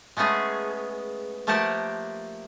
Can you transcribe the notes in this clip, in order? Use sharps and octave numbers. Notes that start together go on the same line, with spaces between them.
G#3 A3 B3 C#4 G#4
F3 A3 A#3 G4 F#5 A5